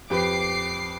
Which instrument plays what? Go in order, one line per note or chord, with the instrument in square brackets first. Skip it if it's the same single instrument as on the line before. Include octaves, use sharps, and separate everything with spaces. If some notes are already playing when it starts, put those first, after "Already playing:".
[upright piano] F2 G4 B4 [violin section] D6 C7